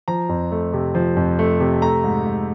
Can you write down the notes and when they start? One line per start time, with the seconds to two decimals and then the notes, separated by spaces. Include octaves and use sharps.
0.08 F3 A#5
0.29 F2
0.52 A3
0.73 C3
0.95 F3
1.16 F2
1.39 A3
1.60 C3
1.82 A3 A#5
2.04 G#2
2.27 G#2